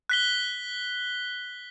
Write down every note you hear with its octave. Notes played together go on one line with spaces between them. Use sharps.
F#6 B6 G7